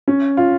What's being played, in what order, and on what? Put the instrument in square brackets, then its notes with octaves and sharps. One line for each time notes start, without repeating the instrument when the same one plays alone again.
[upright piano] C#4
F4